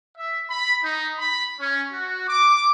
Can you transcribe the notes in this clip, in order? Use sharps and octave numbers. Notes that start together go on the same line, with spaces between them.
E5
B5
D#4
B5
C#4
F#4
D6